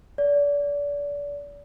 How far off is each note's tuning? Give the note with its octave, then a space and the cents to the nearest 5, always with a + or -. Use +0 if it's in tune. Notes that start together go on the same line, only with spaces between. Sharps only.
D5 -30